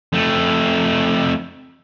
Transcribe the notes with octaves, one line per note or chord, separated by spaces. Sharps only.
F2 A3